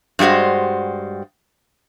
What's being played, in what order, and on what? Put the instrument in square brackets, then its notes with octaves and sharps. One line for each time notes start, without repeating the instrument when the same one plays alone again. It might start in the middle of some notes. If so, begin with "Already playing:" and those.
[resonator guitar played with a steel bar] G2 G3 G#3 F#4 C5